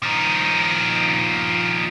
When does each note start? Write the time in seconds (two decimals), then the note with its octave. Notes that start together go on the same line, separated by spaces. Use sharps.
0.03 F3 D#4